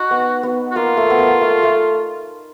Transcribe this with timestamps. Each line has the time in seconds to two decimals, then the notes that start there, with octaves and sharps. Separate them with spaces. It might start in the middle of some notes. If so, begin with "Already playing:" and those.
Already playing: D#4 F#4
0.11 B3
0.43 B3
0.71 F#4
0.76 A#3 F4
0.97 A3
1.10 B3
1.19 A#3
1.41 A3
1.63 A3